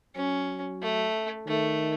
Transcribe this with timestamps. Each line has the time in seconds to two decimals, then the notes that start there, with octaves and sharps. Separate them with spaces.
0.15 F#3 C#4
0.82 A3
1.47 D#3 A3